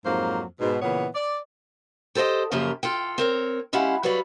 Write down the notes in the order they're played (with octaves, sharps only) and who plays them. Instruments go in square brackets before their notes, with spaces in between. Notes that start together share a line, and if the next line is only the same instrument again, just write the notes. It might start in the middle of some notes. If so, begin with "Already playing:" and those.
[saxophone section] F2 G#2 F#3 A#3 C5
G#2 B2
A#2 C#3 E3 B3 C#5
D5
[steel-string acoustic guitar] G4 A4 C5 C#5 D#5
F#2 C#3 F3 A#3 G4 A#4
F4 A4 G5
C4 A#4 C#5
G#3 C#4 E4 G4 F5 F#5
F#3 G3 B4 C#5 D5 F5